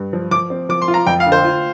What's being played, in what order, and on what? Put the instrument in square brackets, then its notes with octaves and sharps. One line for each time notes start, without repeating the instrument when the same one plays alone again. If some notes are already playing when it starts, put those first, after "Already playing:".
Already playing: [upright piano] G2
F3
[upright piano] F3 [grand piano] D6
[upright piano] C4
[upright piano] F3 [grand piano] D6
[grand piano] C6
[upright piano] F4
[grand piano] A#5
[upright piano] F2 [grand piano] G5
[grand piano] F5
[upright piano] D3
[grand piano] C5
[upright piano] F4